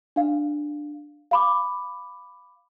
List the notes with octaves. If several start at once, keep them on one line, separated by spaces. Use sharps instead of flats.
D4 F5
F5 B5 D6